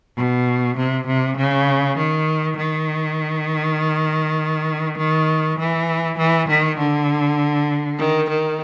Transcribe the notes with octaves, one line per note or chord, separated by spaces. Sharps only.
B2
C3
C3
C#3
D#3
D#3
D#3
E3
E3
D#3
D3
D#3
D#3